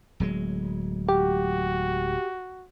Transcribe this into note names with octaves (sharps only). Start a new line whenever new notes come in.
D1 F#3 G#3
F#4 G4